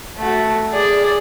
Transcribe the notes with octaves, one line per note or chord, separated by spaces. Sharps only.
A3 F#4
G#4 D5